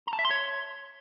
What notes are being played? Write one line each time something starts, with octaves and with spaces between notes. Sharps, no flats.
A#5
A5
E5
C6
C#5